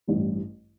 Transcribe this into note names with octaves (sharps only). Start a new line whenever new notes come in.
A1 G2 E3